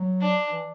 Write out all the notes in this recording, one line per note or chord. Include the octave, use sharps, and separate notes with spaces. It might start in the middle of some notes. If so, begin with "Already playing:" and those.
Already playing: F#3
D4
E3